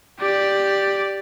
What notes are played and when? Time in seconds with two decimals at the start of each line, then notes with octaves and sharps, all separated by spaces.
0.20 G4 D5